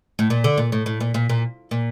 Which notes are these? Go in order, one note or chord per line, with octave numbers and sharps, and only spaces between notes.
A2
A#2
D3
A#2
A2
A2
A#2
A#2
A#2
A#2